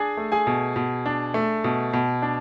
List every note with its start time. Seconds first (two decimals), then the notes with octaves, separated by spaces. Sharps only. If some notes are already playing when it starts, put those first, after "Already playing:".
Already playing: D4 G#4 G#5
0.17 A3
0.32 G#4 G#5
0.47 B2
0.76 B2
1.06 D4
1.34 A3
1.64 B2
1.93 B2
2.22 D4